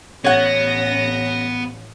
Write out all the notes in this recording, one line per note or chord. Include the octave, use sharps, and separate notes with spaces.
A1 B3 C#4 C#5 F#5 A#6